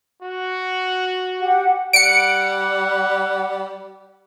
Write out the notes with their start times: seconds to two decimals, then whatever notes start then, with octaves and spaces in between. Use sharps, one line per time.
0.22 F#4
1.40 G4 F#5
1.93 G3 F#5 C#7 D7